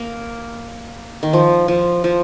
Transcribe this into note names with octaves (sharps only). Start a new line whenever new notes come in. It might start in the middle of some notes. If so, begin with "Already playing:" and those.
Already playing: A#3
D#3
F3
F3
F3